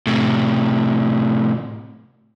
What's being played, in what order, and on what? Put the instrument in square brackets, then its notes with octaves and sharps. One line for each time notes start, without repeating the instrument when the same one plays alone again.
[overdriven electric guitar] A2 C3